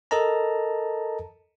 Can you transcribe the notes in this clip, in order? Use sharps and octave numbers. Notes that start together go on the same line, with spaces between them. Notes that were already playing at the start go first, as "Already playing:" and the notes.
A4 A#4 D#5 A5 A#5